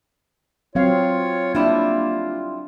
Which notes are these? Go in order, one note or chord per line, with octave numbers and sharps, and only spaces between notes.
F#3 C4 F4 C#5 F5
G3 A#3 D4 E4